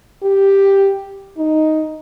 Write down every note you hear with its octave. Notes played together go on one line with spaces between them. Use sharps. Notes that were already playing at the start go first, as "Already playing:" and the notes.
G4
D#4